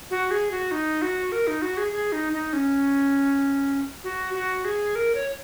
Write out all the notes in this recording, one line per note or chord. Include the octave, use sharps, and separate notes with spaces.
F#4
G#4
F#4
D#4
F#4
A#4
D#4
F#4
G#4
G#4
D#4
D#4
C#4
F#4
F#4
G#4
A#4
C#5